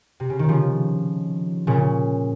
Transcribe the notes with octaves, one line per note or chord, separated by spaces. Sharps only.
C3
C#3
D#3
C#3 F3
A#2 C#3